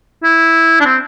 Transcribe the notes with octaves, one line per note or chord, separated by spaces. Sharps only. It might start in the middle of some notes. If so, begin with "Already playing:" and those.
E4
D4
C4